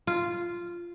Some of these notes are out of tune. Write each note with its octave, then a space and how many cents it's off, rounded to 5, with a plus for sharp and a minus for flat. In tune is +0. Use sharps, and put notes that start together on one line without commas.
F4 -10